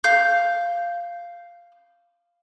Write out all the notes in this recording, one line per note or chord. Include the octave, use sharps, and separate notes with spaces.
F5 G6